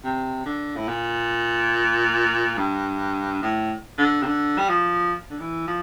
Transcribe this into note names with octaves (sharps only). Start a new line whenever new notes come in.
C3
D3
A2
A#2
G2
A2
D3
C3
D3
G3
F3
D3
E3
F3